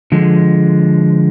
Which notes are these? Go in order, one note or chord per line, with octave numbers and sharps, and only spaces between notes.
D3 F3 G#3